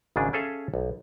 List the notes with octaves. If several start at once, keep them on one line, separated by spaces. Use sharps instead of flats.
G#1 G#2 C#3 D4 G#4
C#4 G#4 A4 E5 F5
B1